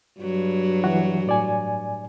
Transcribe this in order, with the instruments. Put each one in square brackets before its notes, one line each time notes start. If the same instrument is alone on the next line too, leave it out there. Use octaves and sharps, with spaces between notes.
[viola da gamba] G2 F#3
[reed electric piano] E3 F#4
A2 D5 G#5